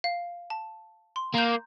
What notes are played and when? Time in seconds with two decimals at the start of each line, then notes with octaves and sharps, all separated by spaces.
0.04 F5
0.50 A5
1.16 C6
1.34 A#3 A#5 G6